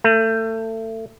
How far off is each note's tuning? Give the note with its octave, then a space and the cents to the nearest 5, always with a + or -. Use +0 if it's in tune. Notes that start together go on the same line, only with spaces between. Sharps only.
A3 +25